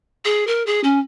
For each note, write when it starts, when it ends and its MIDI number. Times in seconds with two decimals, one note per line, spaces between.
0.25 0.46 68
0.47 0.63 70
0.66 0.80 68
0.84 0.99 61